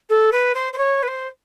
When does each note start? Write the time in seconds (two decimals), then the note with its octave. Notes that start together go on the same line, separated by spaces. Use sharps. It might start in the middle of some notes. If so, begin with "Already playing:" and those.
0.09 A4
0.32 B4
0.55 C5
0.73 C5
0.78 C#5
1.02 B4
1.07 C5